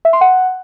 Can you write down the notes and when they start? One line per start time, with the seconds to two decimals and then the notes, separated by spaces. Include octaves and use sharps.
0.05 E5
0.13 C6
0.21 F#5